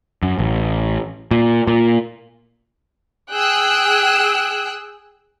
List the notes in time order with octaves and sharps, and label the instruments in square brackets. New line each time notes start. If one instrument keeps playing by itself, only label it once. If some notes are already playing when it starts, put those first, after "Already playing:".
[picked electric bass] F#2
A1
A#2
A#2
[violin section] G#4 G5 E6 F#6